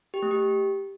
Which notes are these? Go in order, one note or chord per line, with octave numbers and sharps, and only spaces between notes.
G4
A3
G4